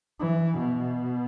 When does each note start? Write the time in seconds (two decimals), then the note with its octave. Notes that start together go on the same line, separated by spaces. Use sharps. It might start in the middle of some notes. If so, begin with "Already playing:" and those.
0.19 E3
0.57 B2